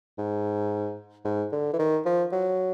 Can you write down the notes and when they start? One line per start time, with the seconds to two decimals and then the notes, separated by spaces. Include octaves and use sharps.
0.18 G#2
1.25 G#2
1.52 D3
1.73 E3
1.79 D#3
2.05 F3
2.32 F#3